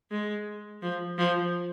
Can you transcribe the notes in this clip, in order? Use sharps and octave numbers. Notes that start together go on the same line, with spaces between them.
G#3
F3
F3